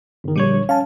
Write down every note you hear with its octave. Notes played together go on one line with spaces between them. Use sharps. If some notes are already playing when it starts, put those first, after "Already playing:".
G1 D#3
A#1 D3 G3 C#5
C#4 F5 A5